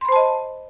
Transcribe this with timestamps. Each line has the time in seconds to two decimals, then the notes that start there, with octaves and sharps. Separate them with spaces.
0.01 C6
0.05 B5
0.09 C5
0.12 A5
0.16 D#5